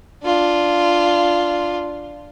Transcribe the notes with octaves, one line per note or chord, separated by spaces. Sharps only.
D4 F4